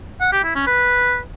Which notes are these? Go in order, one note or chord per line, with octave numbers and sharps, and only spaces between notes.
F#5
G4
E4
C#4
B4